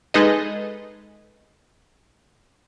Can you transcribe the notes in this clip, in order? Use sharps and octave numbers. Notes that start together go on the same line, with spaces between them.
G#3 D#4 G#4 A4 B4 D#5